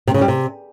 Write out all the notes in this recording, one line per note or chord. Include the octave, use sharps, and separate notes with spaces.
C3
C#3
G3
C3